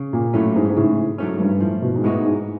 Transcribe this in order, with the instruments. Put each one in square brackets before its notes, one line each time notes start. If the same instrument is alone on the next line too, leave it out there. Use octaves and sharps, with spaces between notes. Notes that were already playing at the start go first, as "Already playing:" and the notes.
Already playing: [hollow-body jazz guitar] C#3
[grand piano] A#2
[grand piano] A2 [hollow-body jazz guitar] F#3 A3 C#4
[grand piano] G#2
G#2
[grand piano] A2 [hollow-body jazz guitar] C#3
[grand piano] G#2 [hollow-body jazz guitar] F#3 A3 C#4
[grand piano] G#2
G2
[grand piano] A2 [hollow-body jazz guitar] F3
[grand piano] B2
G#2
[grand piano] A2 [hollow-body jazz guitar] G#3 B3 D#4 F#4
[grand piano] G#2